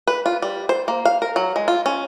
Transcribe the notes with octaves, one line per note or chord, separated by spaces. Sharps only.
B4
F4
G3
C5
A#3
F5
A#4
F#3
G#3
F4
C#4